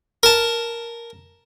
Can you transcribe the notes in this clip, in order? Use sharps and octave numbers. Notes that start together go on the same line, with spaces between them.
A#4 A5